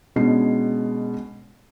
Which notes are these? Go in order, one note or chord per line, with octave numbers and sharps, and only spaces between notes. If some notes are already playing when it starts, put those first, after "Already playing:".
B2 G#3 C#4 D4 C7